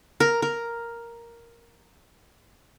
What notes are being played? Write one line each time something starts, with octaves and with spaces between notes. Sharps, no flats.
A#4
A#4